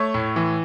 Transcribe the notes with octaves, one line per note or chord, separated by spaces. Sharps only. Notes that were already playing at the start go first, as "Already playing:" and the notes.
Already playing: A3 C#5
A2
E3